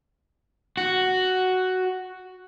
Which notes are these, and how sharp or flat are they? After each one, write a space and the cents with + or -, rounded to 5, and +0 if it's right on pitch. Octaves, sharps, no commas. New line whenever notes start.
F#4 +5